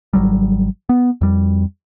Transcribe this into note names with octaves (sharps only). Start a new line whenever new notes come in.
G#1 C#2 F#3 G3
B3
F2 G3